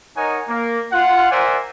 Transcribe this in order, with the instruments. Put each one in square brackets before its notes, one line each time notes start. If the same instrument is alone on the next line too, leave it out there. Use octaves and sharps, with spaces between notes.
[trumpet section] D#4 A#4 C#5 D#5 F#5 G#5
A#3
F4 F#5
A#4 C5 D5 E5 F#5 G#5